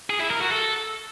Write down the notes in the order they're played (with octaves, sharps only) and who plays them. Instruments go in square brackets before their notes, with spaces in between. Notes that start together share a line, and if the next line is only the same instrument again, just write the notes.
[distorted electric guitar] G#4
E4
A#4
F#4
A4